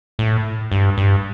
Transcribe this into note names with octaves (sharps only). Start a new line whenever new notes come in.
A2
G2
G2